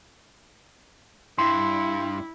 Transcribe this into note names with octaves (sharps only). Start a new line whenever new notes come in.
G2 E4 C6